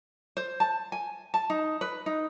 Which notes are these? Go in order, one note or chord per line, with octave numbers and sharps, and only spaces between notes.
C5
A5
G#5
A5
D#4
B4
D#4